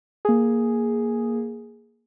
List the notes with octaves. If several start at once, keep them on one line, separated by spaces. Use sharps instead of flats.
A#3 G#4